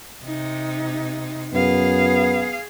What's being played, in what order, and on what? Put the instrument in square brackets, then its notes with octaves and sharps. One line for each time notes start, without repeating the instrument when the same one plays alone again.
[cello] C3 D#4
[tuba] F#2 [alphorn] B3 [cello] G#4 F5